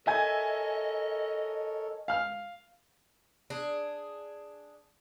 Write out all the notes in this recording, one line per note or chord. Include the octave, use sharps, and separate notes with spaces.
A4 A#4 C#5 D#5 E5 G#5 G#6
F5 F6
D4 G#4